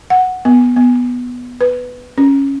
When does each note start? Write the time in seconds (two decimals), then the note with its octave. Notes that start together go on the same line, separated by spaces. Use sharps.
0.10 F#5
0.45 B3
0.77 B3
1.61 B4
2.18 C#4